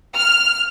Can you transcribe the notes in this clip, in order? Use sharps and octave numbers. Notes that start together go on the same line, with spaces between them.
F6